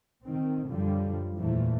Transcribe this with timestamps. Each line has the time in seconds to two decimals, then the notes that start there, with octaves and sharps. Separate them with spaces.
0.23 D#3 C4
0.67 F#2 D3 F3 G3
1.37 E2 A#2 E3 F3 A3